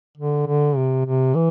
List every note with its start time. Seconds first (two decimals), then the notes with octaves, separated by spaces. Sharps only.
0.17 D3
0.47 D3
0.76 C3
1.05 C3
1.35 E3